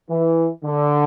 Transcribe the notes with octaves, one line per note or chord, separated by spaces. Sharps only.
E3
D3